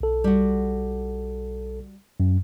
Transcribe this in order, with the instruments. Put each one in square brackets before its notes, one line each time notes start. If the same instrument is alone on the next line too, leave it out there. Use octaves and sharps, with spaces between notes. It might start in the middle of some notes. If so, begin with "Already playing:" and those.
[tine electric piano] B1 A4
[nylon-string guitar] G3 F#4
[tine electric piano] F#2